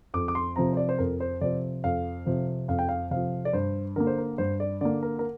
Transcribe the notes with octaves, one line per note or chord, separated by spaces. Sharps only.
F2 D6
D6
C6
C3 F3 C4 A#5
C5
D5
C5
F2 A#4
C5
C3 F3 C4 D5
F2 F5
C3 F3
F2 F5
G5
F5
C3 F3 F5
D5
G2 C5
D3 A#3 A#4
C5
A#4
G2 C5
D5
D3 A#3 D5
A#4
A#4